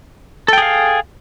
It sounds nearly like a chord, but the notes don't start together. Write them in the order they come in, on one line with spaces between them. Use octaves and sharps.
A4 G5 G#4 F5